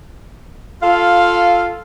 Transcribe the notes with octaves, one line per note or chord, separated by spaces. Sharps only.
F4 A4 F5